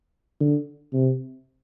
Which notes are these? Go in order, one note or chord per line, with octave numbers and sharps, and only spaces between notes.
D3
C3